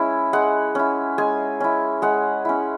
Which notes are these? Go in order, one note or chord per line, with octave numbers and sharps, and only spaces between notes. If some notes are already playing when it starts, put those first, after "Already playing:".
Already playing: G#3 C#4 E4
G#3 F#5
C#4 E4
G#3 G#5
C#4 E4
G#3 F#5
C#4 E4